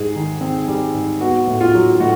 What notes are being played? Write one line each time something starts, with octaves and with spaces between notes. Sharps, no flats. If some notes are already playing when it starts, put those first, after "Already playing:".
Already playing: G#2 G3 G#4
D#3
C4
G3
G#2
B3 F#4
A2
F4
F#3
A2 F#4